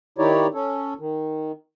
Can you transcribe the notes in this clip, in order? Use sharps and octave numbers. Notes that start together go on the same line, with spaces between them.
D#3 D#4 E4 G4 C#5 D5
C#4 A4
D#3